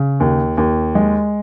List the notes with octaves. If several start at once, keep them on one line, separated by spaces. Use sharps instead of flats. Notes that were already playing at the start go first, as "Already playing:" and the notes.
Already playing: C#3
D#2
D#2
G#3